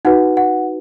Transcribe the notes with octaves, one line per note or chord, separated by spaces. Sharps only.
D#4 F#4 B4 F#5
F#5